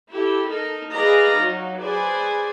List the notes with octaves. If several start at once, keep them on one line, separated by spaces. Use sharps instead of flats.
E4 G4 A4
D#4 A4 A#4
G#4 B4 D5 D#5 F5 A#5
F#3 D#4
G#4 B4 C5 D5 G#5